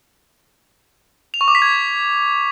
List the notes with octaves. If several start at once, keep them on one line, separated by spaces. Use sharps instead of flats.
F7
C#6
D6
B6
G#6